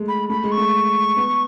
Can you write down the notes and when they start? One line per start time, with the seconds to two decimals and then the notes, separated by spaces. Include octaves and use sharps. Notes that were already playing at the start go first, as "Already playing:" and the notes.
Already playing: G#3 A3
0.08 B5
0.30 A3 B5
0.44 G#3
0.52 C#6
0.57 A3
1.17 B3